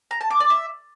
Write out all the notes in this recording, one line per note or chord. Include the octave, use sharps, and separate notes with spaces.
A#5
A5
D6
D5
E5